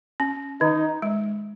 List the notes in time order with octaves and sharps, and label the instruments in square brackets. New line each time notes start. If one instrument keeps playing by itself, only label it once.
[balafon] C#4
[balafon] D#3 [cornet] D#4
[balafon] G#3